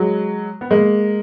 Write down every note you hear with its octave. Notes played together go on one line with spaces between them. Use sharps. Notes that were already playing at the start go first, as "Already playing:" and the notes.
Already playing: F#3 G#3
B3
G#3 A#3